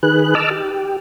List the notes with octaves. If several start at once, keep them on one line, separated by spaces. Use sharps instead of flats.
D#3 G#4 B4 F#6
D#5 A5 D6 E6 F6
G4